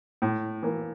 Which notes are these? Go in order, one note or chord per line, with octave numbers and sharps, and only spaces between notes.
A2
E3 A#3